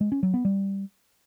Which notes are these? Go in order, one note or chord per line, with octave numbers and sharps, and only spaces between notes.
G#3
C#4
F#3
B3
G3